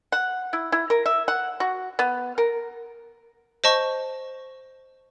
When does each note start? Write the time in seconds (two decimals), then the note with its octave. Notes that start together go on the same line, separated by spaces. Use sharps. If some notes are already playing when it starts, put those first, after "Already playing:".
0.12 F#5
0.53 E4
0.72 E4
0.90 A#4
1.06 E5
1.28 F#5
1.60 F#4
1.99 B3
2.38 A#4
3.64 C5 D#5 A5 C#6